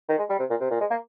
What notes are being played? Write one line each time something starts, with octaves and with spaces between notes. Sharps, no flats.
D#3
G#3
G3
C3
A#2
C3
A#2
G#3
A#3